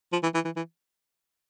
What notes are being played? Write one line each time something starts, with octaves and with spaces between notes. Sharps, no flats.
F3
E3
E3
E3
E3